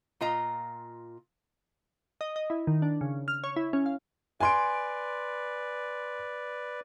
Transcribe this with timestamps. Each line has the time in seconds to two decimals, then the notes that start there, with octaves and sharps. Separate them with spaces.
0.21 A#2 F4 D#5 A#5
2.21 D#5
2.36 D#5
2.50 E4
2.67 D#3
2.82 D4
3.01 C#3
3.28 F6
3.44 C#5
3.56 E4
3.73 C#4
3.86 F5
4.40 B4 D5 G#5 C6 D7